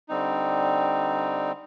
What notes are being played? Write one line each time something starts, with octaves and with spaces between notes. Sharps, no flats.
D3 G3 C4 D#4